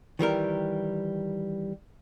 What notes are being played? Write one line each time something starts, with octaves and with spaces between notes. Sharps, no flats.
D#3 E3 G3 A#4